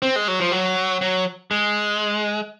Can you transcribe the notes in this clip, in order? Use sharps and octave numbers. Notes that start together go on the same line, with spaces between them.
C4
G#3
F#3
F3
F#3
F#3
G#3